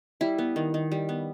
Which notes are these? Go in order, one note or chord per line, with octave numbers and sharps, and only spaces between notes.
G3 E4
B3
D#3
D#3
G3
B3